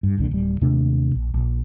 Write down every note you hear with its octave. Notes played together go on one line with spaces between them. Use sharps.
G2
E1 C2 A#2 D3
D1 G3
D#2 C3 A3 D4
A#1
A#1